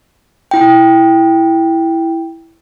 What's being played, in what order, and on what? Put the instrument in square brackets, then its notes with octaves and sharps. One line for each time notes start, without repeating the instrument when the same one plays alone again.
[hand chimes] E4 G5